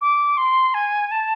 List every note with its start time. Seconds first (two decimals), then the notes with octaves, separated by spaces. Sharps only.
0.01 D6
0.37 C6
0.74 G#5
1.11 A5